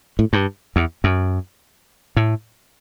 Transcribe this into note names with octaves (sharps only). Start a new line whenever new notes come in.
A2
G2
E2
F#2
A2